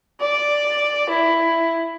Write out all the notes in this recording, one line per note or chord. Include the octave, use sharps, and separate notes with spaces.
D5
E4